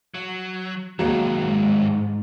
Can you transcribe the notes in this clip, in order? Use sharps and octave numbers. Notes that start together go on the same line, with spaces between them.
F#3
A2 D#3 F#3 G#3 A#3
G#2